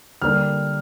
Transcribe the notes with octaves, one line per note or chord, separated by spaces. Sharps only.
D3 G3 A#3 D4 F6